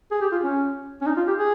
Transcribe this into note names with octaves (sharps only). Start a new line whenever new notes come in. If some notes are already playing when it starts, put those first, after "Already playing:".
G#4
G4
F4
C#4
C#4
D#4
F4
G4
G#4